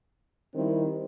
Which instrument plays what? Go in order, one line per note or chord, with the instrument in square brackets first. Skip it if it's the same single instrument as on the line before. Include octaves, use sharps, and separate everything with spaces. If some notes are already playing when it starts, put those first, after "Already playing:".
[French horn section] D#3 G3 C4 E4